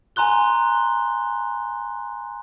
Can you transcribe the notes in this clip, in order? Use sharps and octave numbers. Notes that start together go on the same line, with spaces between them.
G#5 A#5 C6 F#6 G7